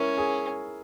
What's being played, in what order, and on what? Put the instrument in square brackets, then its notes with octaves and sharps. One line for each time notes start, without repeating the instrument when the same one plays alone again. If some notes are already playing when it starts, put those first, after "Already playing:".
Already playing: [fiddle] C#4 [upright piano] E4 A#4
[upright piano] G#4